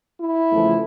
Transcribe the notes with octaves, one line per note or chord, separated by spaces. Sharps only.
E4
E2 C#3 F3 A3